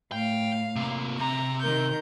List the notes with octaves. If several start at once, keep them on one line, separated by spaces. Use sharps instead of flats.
A2 F5 G5
C3 A#3
C3 A#5
D#3 A#4 G6